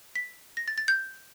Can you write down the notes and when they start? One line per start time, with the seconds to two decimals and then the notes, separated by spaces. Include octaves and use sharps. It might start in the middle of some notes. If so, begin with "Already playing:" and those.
0.15 B6
0.57 A#6
0.68 A6
0.78 A6
0.88 G6